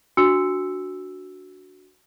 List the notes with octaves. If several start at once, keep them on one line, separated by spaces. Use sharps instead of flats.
D4 F#4 E6 C#7